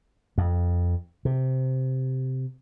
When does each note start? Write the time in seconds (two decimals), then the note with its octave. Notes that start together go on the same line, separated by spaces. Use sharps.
0.38 F2
1.25 C3